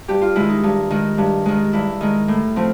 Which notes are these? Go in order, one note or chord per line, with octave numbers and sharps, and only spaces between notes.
G2 G4
F4
D#3 G#3 E4
D#4
G2 D#4
D#3 G#3
G2
D#3 G#3
G2 E4
D#3 G#3
A2
F3 A3 C4